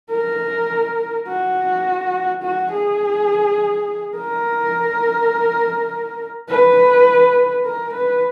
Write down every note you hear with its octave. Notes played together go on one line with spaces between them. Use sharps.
A#4
F#4
F#4
G#4
A#4
B4
A#4
B4